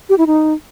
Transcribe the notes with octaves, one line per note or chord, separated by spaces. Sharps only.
G4
E4
D#4